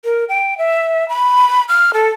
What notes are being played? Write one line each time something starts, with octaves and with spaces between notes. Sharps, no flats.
A#4
G5
E5
B5
F6
A4